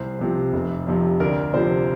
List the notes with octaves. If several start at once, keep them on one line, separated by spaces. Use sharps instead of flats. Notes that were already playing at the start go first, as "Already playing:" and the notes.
Already playing: C2 C5
C3 F3
F1
F2 C3 F3
D2 A#4 D5
C3 F3 C5